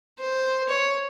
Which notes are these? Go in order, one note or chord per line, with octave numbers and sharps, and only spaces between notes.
C5
C#5